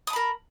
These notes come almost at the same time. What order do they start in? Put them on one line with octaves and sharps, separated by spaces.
D#6 A5 B5 A#4